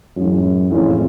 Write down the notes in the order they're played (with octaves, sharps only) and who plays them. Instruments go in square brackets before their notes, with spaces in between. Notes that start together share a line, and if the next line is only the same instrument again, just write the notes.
[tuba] F#2 [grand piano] A2 E3 G#3 C#4 F4
[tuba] F2 [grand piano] A2 E3 G#3 C#4 F4